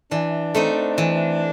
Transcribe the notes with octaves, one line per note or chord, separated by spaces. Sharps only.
E3 D4
A3 C4 D#4
E3